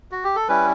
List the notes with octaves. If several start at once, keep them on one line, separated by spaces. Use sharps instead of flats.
F#4
G4
A4
G3 C#4 E4 B4